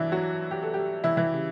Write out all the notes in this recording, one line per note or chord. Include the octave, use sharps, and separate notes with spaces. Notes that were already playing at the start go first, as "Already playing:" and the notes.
Already playing: G2 E3 F#3 D4 E4
F#3 F#4
G4
A4
G3 G4
E3 E4
E3 E4
C#3 G3